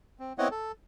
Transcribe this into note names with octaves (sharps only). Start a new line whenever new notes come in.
C4
B3 C4 E4 C#5 D#5 F#5
A4